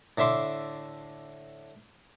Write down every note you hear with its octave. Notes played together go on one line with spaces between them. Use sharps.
A2 D3 E5 C6 D6